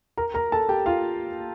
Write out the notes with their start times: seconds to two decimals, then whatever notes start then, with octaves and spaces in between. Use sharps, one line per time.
0.18 A#4 A#5
0.34 A#4 A#5
0.52 A4 A5
0.69 G4 G5
0.86 F4 F5